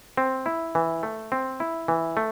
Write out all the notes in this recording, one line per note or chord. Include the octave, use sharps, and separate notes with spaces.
C4
E4
E3
A3
C4
E4
E3
A3